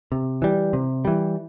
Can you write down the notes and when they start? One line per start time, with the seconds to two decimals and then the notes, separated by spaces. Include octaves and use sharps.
0.12 C3
0.42 E3 G3
0.73 C3
1.05 E3 G3